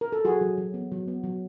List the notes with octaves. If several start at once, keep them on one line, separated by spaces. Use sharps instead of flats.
A#4
A4
F#3 F#4 G#4
F#3
F#3
B3
F#3
B3
F#3